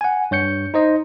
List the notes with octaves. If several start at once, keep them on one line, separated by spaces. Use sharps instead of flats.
F#5 G#5
G2 C#5 G6 C#7
D#4 C5 D#5